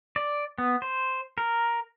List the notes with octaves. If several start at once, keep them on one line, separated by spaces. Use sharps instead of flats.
D5
B3
C5
A#4